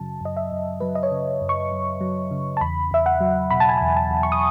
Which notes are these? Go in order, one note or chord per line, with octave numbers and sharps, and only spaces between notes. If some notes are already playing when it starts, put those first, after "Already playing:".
Already playing: F#2 C#3 F#3 A5
F#2 D#5
E5
F#2
F#3 B4
D#5
C#5
C#3
F#2
C#6
F#2
F#3
C#3
A5
E2 B5
E2 E5
F#5
F#3
B2 B5
A5
G#5
E2 A5
A5
E2
C#6
D#6